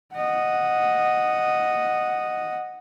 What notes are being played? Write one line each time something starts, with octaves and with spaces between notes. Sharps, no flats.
D#5 F#5